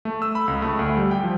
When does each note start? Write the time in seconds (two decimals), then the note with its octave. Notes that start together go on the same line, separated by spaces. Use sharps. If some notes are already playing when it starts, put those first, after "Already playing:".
0.05 A3
0.22 E6
0.35 B5
0.48 C#2
0.62 A3
0.79 D2
0.97 G3
1.11 G5
1.23 F3